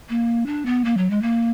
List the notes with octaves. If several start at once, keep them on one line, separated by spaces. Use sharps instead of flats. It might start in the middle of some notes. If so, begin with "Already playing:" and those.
A#3
D4
B3
A#3
F#3
G#3
A#3